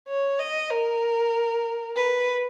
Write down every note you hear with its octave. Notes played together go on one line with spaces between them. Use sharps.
C#5
D#5
A#4
B4